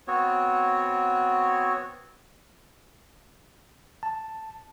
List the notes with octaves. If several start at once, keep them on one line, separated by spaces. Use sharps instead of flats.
B3 C4 F#4 C#5
A5